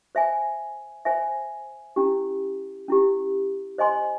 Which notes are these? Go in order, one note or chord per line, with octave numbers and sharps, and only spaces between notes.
C5 E5 G#5
C5 E5 G#5
C#4 E4 G4
C#4 E4 G4
C5 D#5 G#5 C6